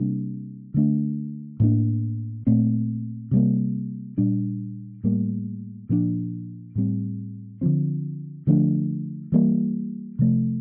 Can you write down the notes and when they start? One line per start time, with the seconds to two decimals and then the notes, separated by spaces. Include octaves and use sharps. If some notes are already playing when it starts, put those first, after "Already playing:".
Already playing: C3 G3 A#3 D4
0.74 D3 A3 D4
1.60 A2 G3 A#3 D4
2.47 A#2 A3 C4
3.31 C3 G3 A#3
4.17 A#2 G3 D4
5.04 A2 G3 A#3
5.89 A#2 F3 A#3 D4
6.75 A2 G3 C4
7.61 D3 F3 C4
8.47 D3 F3 A3 D4
9.32 E3 G3 A#3
10.19 C3 F3 A3